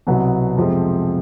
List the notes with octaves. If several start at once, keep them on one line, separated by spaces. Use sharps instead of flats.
C2 B2 F#3 B3
F2 C3 F3 G#3 C4